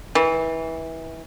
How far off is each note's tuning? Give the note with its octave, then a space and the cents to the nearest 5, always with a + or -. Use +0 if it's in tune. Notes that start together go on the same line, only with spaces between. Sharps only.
E3 -20